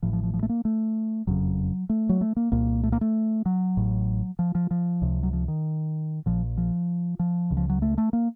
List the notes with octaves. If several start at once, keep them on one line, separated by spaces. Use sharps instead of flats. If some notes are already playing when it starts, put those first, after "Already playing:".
A1 A2 F3
F3
F3
F3
A3
A#3
A3
F#1 F2 C#3 F#3
A3
F#3
A3
A#3
C2 A#2 A#3
A3
A#3
A3
F#3
A1 A2
F3
F3
F3
C#2 C3
F#3
F3
D#3
A#1 A#2 F3
F3
F3
C#2 C#3
F3
F#3
A3
A3
A#3